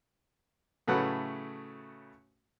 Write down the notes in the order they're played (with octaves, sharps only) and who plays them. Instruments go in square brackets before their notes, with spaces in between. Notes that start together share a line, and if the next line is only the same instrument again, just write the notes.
[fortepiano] A2 C#3 F#3 A3 B4 F#5